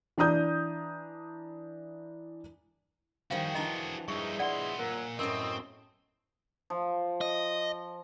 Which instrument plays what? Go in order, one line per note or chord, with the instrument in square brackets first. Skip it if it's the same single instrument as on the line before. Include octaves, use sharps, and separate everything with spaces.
[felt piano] E3 D4 A#5 D#6 G6
[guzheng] D#3 F3 G3 [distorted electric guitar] F#4 G#4 [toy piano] F5
[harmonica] E3 [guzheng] D4 F4 [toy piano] D#5 A#5
[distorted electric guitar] G2 D#4 [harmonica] E3 G#3 E5 [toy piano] C#6
[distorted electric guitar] B3 C6 [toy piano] D5 F#5
[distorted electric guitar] A#2 [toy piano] A#4 [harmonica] F#5 A#5
[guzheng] F#2 A2 [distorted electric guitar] C4 [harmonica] E4 D#5 C#6 [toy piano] A#4 E6
[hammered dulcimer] F3
[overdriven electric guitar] D#5